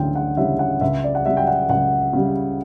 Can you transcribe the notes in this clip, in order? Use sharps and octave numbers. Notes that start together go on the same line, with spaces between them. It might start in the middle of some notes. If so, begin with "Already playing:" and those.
Already playing: D2 C#3 E3 C#4 G5
F#5
C#3 E3 G3 C#4 E5
F#5
C#2 E5
D5
F#5
C#3 G3 E5
G5
F#5
C#2 F#5
C#3 G3